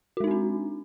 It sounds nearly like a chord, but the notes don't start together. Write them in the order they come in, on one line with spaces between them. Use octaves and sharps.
F#4 G#3 D#4 C4 D4